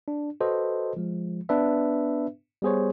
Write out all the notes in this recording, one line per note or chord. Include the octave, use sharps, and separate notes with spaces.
D4
F#4 A4 B4 C5 D#5
F3 G#3
B3 D4 B4 E5
G3 B3 G#4 C5 C#5